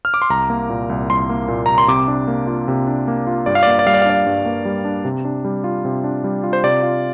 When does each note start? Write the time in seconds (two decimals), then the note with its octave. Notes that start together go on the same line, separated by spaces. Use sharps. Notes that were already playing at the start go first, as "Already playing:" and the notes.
0.05 F6
0.14 D6
0.22 C6
0.30 C2 A#5
0.50 A#3
0.70 A#2
0.89 C2
1.09 C2 C6
1.29 A#3
1.48 A#2
1.66 C2 A#5
1.78 C6
1.88 C3 D6
2.08 D4
2.28 A#3
2.47 F4
2.68 C3
2.87 D4
3.08 A#3
3.27 F4
3.46 G2 D5
3.55 F5
3.63 D5
3.67 A#3 F5
3.79 D5
3.87 G3 F5
3.94 D5
4.02 F5
4.06 D4 D5
4.26 G2
4.46 A#3
4.65 G3
4.85 D4
5.05 C3
5.25 D4
5.45 G3
5.64 F4
5.85 C3
6.04 D4
6.24 G3
6.43 F4
6.53 C5
6.63 C3 D5
6.83 F4